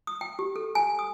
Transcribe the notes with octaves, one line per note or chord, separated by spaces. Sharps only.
D#6
G5
G4
A4
G#5
D#6